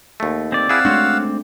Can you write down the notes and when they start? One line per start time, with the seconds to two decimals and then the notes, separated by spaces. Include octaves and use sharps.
0.20 D#2 A3
0.52 C4 D5
0.69 E4 G#4 F5 F#5 E6
0.85 G#3 A3 D4 F#4 C5 C#5